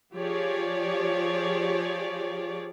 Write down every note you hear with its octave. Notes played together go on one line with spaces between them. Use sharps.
F3 G4 G#4 C#5 D5